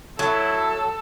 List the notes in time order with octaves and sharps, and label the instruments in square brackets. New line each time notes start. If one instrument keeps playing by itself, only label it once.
[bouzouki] F#3 [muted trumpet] E4 [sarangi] A4